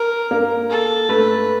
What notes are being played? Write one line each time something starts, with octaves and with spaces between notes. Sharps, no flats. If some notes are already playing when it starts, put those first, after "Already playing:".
Already playing: A#4
A#3
A4
A3 B4